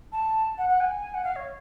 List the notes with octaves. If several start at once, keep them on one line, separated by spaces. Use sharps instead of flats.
A5
F#5
F#5
G#5
F#5
F5
C#5